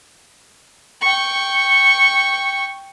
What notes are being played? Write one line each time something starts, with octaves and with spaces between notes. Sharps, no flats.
G5 C#6